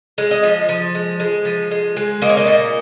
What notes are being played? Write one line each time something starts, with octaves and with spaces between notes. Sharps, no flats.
G#3
D#5
F3
F3
G#3
G#3
F3
G#3
G#3
A#3 D#5
C#5
D#5
A#2